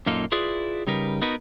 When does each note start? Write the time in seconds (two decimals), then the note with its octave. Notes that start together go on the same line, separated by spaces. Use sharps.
0.06 F#2 A#2 A#3 D#4 F4 A4
0.32 E4 F4 G#4 B4 D5
0.87 C#3 G3 D#4 A#4 B4
1.22 B3 D#4 F#4 A#4 B4